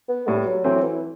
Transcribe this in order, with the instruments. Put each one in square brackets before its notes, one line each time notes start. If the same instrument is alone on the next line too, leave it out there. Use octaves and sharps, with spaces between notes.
[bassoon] B3
[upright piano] A2 [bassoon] G3
[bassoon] F#3
[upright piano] E3 A3 C4 [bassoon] F#3
[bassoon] E3